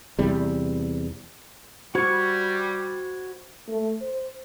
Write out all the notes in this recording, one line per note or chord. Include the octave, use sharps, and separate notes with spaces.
E2 C3 G3
G3 F#4 C5 B5 C#6 G#6
A3
C5